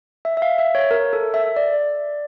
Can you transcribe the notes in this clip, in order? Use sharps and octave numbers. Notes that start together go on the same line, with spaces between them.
E5
E5
F5
E5
C#5
A#4
A4
E5
D5